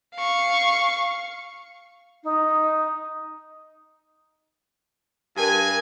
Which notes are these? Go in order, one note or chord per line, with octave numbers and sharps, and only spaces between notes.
F5 C#6
D#4
G2 G4 A#4 G#5